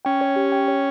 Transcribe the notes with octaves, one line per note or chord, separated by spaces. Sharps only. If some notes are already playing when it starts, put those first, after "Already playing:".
C#4 G5
C#5
G4
G5
C#5